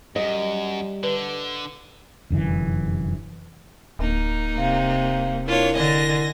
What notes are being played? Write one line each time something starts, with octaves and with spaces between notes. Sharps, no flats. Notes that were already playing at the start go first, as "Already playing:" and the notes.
F#2 G3 D#5
D3 B4
F1 F#2 D3 E3
D1 A#3 D#4
C3 F5
D4 E4 F4 A#4 C#5
D3 D#5 G#5 A#6